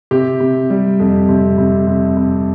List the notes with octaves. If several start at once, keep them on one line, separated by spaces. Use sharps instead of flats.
C3 G4
C3
G3
F2
C3
C3
C3
C3